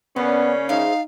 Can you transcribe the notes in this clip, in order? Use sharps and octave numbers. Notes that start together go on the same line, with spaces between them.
C#3 A#3 B3 C#4 D4
G#3 D#4 C5 E5 F5